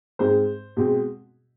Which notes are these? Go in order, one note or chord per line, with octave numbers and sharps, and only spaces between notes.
G#2 G#3 C4 C5
B2 G#3 C4